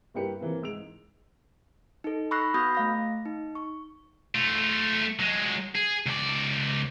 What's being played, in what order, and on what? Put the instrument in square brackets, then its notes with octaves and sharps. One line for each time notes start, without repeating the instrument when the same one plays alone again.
[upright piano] G2 A#3 E4 G4 B4 C#7
E3 A#3 C4
G#2 E6 D7 F7
[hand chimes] D#4 A4
B5 C#6 E6 F#6 A#6 C7
B3 F#4 B5 D#6 G6 A#6
A3 F5 A#6
D#4
C#6
[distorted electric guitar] A3 F4
F#3 G#3
G#4
C#2 D5